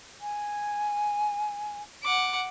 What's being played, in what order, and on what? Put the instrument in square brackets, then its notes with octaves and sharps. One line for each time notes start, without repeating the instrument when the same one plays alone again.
[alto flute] G#5
[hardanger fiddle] F#5 D6